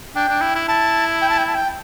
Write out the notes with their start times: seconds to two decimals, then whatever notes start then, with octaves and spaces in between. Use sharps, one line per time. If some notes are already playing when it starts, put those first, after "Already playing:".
0.15 D4 G5
0.28 D4
0.41 E4
0.55 E4
0.68 E4 A5
1.21 G5
1.30 A5
1.38 G5
1.47 A5
1.55 G5